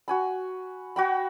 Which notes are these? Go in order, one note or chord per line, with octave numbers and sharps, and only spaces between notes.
F#4 G#5 B5
F#4 G5 B5